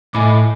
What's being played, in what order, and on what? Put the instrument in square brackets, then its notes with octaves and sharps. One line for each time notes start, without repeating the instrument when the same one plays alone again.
[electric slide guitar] A2 [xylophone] D#5 G#5 B5 D6